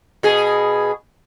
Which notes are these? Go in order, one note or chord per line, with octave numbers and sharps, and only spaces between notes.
B2 G#4